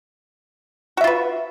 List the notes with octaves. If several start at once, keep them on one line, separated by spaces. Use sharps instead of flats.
F4 F#4 B4 E5